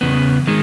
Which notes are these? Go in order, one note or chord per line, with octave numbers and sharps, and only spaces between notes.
E2 C#3 B3
D#3 G#3